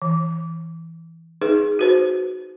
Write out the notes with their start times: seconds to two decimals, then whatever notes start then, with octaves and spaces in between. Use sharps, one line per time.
0.02 E3
1.41 D#4 G#4 B4
1.79 F#4 B4 C5